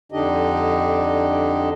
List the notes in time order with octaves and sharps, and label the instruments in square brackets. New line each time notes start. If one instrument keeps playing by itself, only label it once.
[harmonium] F2 D3 D4 D#4 G4 D#5